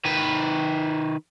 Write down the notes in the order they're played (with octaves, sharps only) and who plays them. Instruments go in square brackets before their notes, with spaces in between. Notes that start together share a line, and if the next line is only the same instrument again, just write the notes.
[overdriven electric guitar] D#3 B4